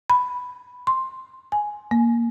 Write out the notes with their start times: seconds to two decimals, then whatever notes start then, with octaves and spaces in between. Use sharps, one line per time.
0.10 B5
0.87 C6
1.52 G#5
1.91 A#3